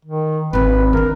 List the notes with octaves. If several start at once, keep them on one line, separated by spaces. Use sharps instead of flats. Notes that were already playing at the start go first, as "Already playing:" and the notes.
D#3
G#1 C4 B4
D#3 D4 A#4